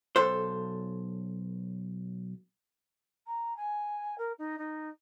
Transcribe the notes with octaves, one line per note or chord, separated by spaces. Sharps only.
B1 A4 C5
A#5
G#5
A#4
D#4
D#4